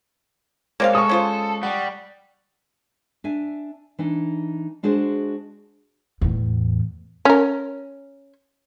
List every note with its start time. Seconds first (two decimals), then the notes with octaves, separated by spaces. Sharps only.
0.80 G#3 A#3 C4 C#5 D5 F5
0.95 G#3 A4 C#6 D#6
1.09 C#4 F4 C5
1.63 G3 F#5
3.24 D4 E5 G#5
3.99 E3 D4 D#4
4.83 G#3 D4 F#4 G#4 C5
6.21 E2 A2
7.25 C#4 A#4